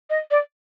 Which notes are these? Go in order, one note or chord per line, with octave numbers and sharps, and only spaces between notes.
D#5
D5